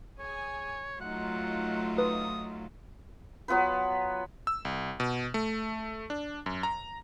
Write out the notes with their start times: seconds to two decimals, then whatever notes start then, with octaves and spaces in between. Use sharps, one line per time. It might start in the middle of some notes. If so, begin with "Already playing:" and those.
0.19 G#4 C#5 G#5
1.00 F#3 A3 D#4 F4 F#5
1.98 B4 D#6
3.48 F#3 B3 F4 B4
4.47 E6
4.65 C2
5.00 B2
5.34 A3
6.10 D4
6.46 F#2
6.63 A#5